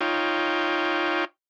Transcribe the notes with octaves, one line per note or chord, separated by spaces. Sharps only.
D#4 F4 C#5 G5